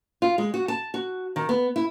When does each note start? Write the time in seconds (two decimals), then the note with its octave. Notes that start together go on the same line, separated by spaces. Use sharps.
0.22 F4
0.38 G#3
0.54 F#4
0.68 A5
0.94 F#4
1.36 D#3
1.49 B3
1.76 E4